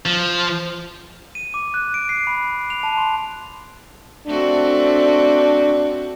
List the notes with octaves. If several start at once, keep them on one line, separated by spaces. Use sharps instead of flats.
F3
D#7
D6
F#6
D7
C7
B5
F7
A5
C6
A3 C4 D4 F#4